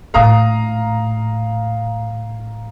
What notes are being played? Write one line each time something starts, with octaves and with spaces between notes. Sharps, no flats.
A#1 A2 F5 A#5 D#6